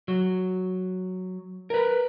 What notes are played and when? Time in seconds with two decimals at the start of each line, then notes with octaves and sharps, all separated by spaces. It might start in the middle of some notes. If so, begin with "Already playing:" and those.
0.08 F#3
1.70 A#4 B4